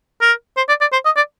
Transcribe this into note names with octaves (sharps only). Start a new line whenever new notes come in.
A#4
C5
D5
D5
C5
D#5
D5